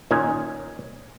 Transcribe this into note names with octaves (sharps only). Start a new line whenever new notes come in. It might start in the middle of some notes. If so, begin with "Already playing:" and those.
A#2 D#3 C#4 G#5